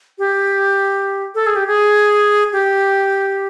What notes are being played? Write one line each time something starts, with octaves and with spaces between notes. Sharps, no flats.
G4
A4
G#4
G4
G#4
G4